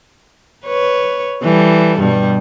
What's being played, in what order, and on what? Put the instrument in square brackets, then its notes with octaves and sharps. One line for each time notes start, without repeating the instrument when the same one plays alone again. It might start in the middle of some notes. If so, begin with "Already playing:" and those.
[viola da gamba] B4 C#5
E3 G3 A4
G2 B2 G3